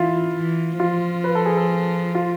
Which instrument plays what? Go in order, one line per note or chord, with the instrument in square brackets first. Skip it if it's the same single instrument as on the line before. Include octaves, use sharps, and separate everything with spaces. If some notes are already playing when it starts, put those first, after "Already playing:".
Already playing: [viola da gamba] E3 [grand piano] E4 F4
[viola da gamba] E3
[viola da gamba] F3 [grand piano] F4
[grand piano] B4
A4
G#4
A4
F4